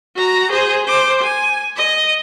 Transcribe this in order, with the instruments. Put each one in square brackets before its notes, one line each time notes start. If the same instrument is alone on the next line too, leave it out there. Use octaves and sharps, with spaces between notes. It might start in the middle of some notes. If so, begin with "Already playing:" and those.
[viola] F#4 A#5
G#4 C5
C5 D6
G#5
D#5